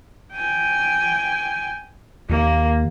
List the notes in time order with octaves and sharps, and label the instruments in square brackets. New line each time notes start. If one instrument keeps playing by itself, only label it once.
[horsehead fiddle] G5 G#5
[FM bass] D#2 [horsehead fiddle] A#3